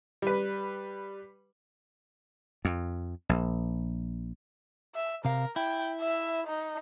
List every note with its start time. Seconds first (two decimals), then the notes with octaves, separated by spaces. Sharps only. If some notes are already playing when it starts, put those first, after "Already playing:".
0.22 G3 B4
2.65 F2
3.29 A#1
4.95 E5
5.25 C3 A#4 F5
5.56 E4 G5
6.01 E5
6.47 D#4